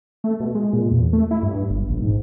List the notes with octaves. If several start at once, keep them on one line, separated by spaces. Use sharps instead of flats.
A3
B2
G#3
A#2
E2
A3
E4
G2
G1
A#1
G#2